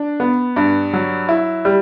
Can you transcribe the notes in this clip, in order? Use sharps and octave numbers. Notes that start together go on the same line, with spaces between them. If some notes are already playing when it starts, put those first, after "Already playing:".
Already playing: D4
B3
G2
F#3
E4
G3